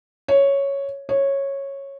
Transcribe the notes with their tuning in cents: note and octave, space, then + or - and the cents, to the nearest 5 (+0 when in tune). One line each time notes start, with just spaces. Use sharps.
C#5 +0
C#5 -10